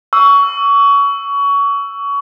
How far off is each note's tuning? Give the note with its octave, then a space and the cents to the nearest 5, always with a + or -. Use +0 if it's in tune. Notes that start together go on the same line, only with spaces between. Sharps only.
C#6 +25 E6 +5